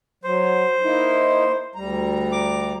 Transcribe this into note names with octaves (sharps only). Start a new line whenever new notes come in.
F#3 C5
A#3 D#4 E4
D2 G3 A#5
D6